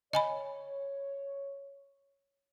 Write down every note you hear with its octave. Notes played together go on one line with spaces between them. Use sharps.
C#5 D#5 G#5 B5